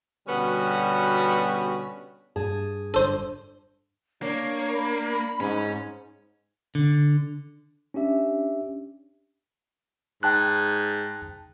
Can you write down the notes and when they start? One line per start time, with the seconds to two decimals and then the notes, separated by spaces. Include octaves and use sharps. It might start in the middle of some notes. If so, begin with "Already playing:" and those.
0.28 B2 D3 G3 B3 C#4 F#4
2.36 G2 G#4 A5
2.94 D3 A4 C5
4.22 A#3 D4 C#5
4.74 B5
5.40 G#2 C#4
6.75 D3
7.94 C#4 D4 G4 E5
10.23 G#2 G5 A5 F#6